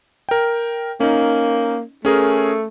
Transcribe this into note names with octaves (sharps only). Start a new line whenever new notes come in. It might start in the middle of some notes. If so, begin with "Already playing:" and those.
A#4 G5
A#3 C#4 D#4
A3 C#4 G#4 A#4